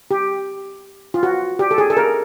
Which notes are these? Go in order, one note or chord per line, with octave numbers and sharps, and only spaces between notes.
G4
F4
F#4
G4
A4
G#4
A4
A#4